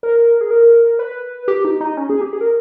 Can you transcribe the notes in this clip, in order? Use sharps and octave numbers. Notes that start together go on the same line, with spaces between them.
A#4
G#4
A#4
B4
G4
D#4
D#4
C#4
G#4
G4
G#4
A#4